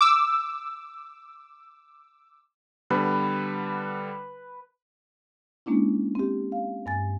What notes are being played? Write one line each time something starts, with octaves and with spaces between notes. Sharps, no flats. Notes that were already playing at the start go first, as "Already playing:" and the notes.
D6 E6
D3 G3 B3 B4
G#3 A#3 C#4 D4 E4
C4 G4
F5
G2 G#5 A6